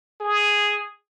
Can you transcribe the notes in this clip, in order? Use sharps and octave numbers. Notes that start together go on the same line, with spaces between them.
G#4